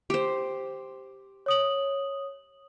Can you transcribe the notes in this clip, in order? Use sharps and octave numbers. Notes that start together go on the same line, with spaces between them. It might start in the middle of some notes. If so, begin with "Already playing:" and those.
G4 C5
C#5 D#6 F#7